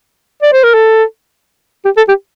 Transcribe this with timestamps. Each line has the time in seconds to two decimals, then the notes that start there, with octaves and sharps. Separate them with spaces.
0.43 D5
0.53 C5
0.64 A#4
0.74 A4
1.85 G4
1.97 A4
2.08 G4